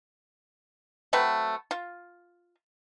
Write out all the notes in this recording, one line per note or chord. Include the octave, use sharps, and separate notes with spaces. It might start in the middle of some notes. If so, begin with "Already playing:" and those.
F#3 A3 C4 B4
F4